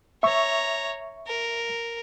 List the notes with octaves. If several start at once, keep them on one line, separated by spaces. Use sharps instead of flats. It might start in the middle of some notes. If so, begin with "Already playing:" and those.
C#5 E5 A#5 C#6
A#4